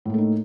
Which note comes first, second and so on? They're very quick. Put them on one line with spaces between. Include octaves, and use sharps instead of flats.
A2 A#3 A3 D#4